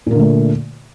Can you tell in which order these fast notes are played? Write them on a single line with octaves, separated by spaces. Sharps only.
A#2 A#3 D3 A3